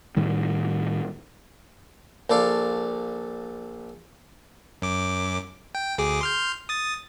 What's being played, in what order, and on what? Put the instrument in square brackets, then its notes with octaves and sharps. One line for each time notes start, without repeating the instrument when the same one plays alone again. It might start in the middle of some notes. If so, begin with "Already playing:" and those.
[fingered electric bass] A2 D#3 G3
[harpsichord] A#1 A4 D5 F5
[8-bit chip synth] F#2 D6
G5
D2 G#4 D6
C6 F6 G6
D#6 A6